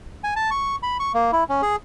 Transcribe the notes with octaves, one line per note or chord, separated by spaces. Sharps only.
G#5
A5
C#6
B5
C#6
A#3
E4
C#4
G#4